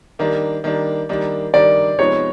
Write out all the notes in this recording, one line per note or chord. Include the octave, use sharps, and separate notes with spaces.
D#3 G3 A#3 D4
D#3 G3 A#3 D4
D#3 G3 A#3 D4
D#3 G3 A#3 D4 D5
C3 F3 G#3 B3 D#4 C#5